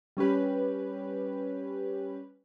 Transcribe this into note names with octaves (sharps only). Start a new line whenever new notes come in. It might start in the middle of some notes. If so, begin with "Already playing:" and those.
G3 C#4 G4 B4